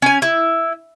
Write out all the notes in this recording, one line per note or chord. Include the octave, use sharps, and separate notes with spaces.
C#4 G#5
E4